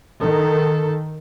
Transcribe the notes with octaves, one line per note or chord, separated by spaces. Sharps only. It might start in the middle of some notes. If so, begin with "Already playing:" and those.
D#3 A4